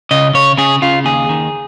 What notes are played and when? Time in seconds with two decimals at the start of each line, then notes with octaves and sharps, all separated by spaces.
0.11 C#3 D#5
0.34 C#3 C#5
0.58 C#3 G#4
0.82 C#3 F4
1.05 D#2 G#4
1.29 D#3